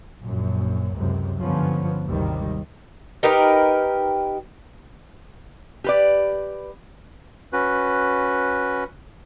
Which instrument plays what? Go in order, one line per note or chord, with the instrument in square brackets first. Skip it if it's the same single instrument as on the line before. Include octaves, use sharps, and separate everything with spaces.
[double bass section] A#1 F#2
C#2 F#2 C3
G2 D3 F3 B3 C#4
G#1 D#2 C3 D#3 G3
[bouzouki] D#4 G4 A#4 B4
[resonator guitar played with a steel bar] G4 B4 D5
[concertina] C#4 F#4 B4